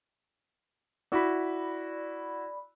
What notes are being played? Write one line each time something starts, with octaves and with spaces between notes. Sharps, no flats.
E4 F#4 D5 B5